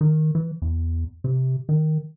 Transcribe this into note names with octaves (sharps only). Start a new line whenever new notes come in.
D#3
E3
E2
C3
D#3